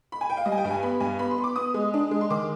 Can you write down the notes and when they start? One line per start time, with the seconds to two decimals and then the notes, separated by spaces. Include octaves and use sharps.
0.12 B5
0.21 G#5
0.30 G5
0.37 F5
0.45 G3 D#5
0.52 G#5
0.58 G5
0.64 G2
0.71 G#5
0.83 B3 B5
1.00 G2 G#5
1.19 B3 B5
1.31 C6
1.38 B3
1.44 D6
1.56 B3 D#6
1.74 G#3
1.94 D4
2.11 G#3
2.21 C6
2.30 D#3 D6